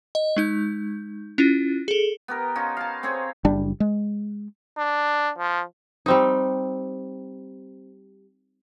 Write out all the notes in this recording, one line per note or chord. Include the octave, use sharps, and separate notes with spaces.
D#5
G#3 D#4 G6
C#4 E4 F4
G#4 A4
B3 G4 A#4
C#4 D#4 F4
F5 A5
C4 C#4 G#4 C#5
F#1 G3 D4
G#3
D4
F3
G3 C4 D#4